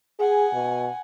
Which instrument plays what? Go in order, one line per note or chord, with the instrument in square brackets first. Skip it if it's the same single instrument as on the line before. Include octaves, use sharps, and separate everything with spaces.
[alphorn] G#4 [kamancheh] F#5 G#5
[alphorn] B2